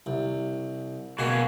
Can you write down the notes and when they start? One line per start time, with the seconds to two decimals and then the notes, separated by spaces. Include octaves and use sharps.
0.06 C2
1.19 B2 A#3 F#4 G#4